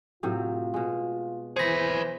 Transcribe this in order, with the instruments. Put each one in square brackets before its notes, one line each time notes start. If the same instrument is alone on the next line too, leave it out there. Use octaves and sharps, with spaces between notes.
[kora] A2 C3 F#3 [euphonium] F4
[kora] B2 G#3
[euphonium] E3 [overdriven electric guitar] G#4 B4 [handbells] C5 A#6